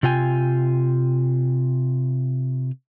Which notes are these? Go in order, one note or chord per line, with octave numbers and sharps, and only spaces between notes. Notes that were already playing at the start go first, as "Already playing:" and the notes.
C3 F4 G5 G#5